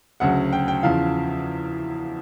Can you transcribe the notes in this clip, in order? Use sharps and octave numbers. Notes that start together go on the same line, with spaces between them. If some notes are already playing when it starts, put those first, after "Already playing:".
D2 C#3 F#3 F#5
G5
G5
E2 C#3 F3 F5